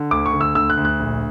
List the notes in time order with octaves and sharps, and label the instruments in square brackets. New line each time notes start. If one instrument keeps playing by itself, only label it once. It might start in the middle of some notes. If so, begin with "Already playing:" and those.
Already playing: [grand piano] D3
D2 D6
C#6
D3
E6
D2 E6
F#6
D2
F#6
A#1